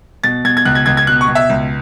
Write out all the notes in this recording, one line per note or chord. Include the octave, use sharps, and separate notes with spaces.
B2 A6
B2 G#6
G#6
C#2 F#6
G#6
C#2 G#6
G#6
B2 F#6
C#6
B2
E5
C#2